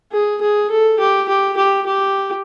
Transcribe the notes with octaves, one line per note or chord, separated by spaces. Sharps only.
G#4
G#4
A4
G4
G4
G4
G4